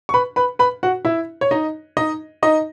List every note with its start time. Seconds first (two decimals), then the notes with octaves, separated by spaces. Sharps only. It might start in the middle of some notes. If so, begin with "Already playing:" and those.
0.09 C#6
0.14 B4 B5
0.36 B4 B5
0.59 B4 B5
0.83 F#4 F#5
1.05 E4 E5
1.41 C#5
1.51 D#4 D#5
1.97 D#4 D#5
2.43 D#4 D#5